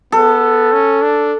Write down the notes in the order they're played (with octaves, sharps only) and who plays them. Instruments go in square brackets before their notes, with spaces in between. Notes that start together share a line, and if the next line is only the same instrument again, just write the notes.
[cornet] B3 [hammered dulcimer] A4
[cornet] C#4
D4